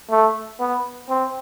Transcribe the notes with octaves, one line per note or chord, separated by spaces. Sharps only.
A3
B3
C4